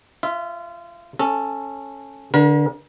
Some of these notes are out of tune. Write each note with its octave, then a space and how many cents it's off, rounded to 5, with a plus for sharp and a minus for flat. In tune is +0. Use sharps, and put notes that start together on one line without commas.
F4 -25 E5 +0
C#4 -15 A4 +0
D3 +0 A#4 +45